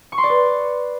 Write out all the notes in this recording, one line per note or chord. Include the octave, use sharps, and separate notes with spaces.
C#6
C6
D5
B4